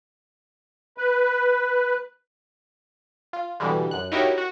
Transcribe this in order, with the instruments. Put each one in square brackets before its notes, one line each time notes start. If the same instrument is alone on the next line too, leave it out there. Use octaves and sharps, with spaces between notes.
[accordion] B4
[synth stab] F4
B2 D3 E3 G3 G#3
F#2 F#6
D#4 E4 F#4 G4 A#4 C#5
F#4